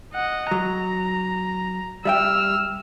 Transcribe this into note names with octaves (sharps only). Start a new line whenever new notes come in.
D#5 F#5
F#3 A#5
G3 E5 G5 E6 F6